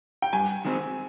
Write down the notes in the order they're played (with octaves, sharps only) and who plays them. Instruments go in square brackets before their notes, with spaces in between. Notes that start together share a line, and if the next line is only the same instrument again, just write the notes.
[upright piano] G5
[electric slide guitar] G2 [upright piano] G#5
[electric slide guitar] D#3 G#3 C4